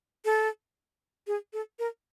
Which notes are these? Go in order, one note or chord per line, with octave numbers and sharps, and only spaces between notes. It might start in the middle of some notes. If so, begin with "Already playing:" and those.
A4
G#4
A4
A#4